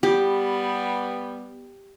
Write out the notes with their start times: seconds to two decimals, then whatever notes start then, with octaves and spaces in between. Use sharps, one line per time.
0.03 G3 B3 G4